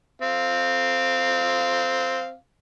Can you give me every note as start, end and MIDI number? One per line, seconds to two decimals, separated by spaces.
0.22 2.35 60
0.22 2.35 77